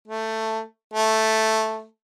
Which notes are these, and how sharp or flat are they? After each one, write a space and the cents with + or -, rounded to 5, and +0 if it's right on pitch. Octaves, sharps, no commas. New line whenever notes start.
A3 +10
A3 +0